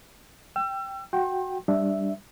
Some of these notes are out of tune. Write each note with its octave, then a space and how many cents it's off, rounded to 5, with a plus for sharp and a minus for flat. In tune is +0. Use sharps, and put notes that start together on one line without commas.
G5 +0 E6 +35
F#4 +0 G5 +0 C6 +40
G3 +0 D4 +0 E5 +0